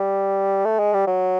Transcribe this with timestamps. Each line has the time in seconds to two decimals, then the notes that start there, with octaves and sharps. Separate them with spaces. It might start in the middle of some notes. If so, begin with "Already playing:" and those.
Already playing: G3
0.65 A3
0.79 G#3
0.93 G3
1.07 F#3